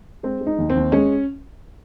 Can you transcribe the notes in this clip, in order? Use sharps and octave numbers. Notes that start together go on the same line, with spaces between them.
G#3 C4
G#3
D#4
D#2
C4
D#2
G#3 C#4